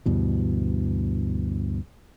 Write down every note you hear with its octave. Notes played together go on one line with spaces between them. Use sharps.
D2 G2 B2 E3